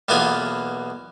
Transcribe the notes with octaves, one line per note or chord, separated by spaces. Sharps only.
B1 E2 A#3 B3 F4 G#5